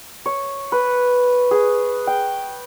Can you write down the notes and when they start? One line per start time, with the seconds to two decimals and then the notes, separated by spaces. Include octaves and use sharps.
0.26 C#5
0.72 B4
1.51 G#4
2.07 G5